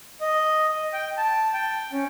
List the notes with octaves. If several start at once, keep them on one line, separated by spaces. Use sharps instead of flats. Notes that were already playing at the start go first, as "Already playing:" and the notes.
D#5
G5
A5
G5
C#4